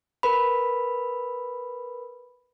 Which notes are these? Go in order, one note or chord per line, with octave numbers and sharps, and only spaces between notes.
A#4 B4 B5